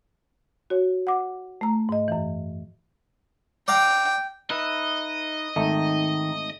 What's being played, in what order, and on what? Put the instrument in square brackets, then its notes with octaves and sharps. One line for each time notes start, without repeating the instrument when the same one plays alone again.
[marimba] F#4 C#5
F#5 D6
A3 A#5
G#2 D#5
F#2 E3
[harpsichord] D5 F5 A#5 [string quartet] G5
[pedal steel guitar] D#4 B4 E5 [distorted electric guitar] D#5
[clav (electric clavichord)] G#1 A3 D#4 [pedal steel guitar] D#3